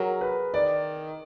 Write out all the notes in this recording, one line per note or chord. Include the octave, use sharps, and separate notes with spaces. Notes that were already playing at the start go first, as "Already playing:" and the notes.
Already playing: F#3 G#4 A#4
B4
D#3 D5